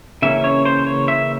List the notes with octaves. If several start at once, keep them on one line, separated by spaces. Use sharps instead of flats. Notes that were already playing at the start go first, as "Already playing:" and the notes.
C#3 E3 A#3 C#4 E5
C#5
C5
C#5
E5